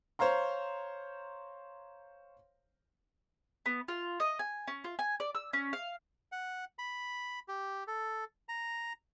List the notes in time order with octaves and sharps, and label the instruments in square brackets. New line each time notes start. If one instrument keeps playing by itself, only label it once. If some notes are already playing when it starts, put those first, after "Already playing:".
[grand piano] C5 C#5 F5 A#5 C6
[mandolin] B3
F4
D#5
G#5
C#4
F4
G#5
D5
E6
C#4
F5
[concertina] F#5
B5
G4
A4
A#5